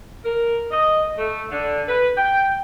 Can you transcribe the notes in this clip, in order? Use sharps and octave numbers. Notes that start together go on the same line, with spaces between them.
A#4
D#5
A3
D3
B4
G5